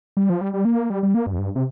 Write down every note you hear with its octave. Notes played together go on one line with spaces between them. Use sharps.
G3
F3
G3
G3
A#3
G3
G3
A#3
G2
F2
G2
C3